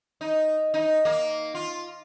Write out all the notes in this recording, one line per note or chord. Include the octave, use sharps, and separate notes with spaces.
D#4
D#4
A#3
F4